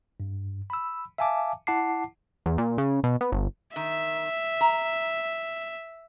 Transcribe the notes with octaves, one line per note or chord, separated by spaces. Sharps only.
G2
B5 E6
E5 F5 G#5 A5 D6
E4 F#5 A5 D6 C7
E2
A#2
C#3
B2
B3
G1
D#3 E5
A#5